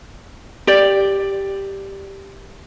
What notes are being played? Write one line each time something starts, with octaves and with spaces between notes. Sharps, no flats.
G4 D5